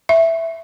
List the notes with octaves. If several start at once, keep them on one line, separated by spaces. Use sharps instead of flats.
E5